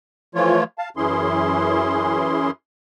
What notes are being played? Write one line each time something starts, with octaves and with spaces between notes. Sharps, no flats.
E3 F3 A3 F4 C#5
F5 A5
F#2 E3 C#4 E4 G#4 C6